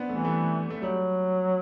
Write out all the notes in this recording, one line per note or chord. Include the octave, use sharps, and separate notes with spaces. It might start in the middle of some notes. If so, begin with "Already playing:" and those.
Already playing: B3 C4 D4
E3 A3
G3
A3
A3
F#3 G3